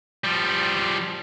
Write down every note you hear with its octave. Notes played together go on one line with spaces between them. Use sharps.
F3 G3